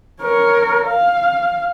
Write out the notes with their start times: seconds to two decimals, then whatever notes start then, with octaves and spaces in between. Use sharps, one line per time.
0.22 A#4 C#5
0.87 F5